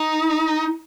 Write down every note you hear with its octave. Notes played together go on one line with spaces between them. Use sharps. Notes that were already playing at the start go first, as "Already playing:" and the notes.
Already playing: D#4